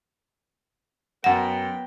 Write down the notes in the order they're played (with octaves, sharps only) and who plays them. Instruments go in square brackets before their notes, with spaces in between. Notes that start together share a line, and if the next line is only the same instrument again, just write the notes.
[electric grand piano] F#2 A#6 [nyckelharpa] B3 G5 [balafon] F#5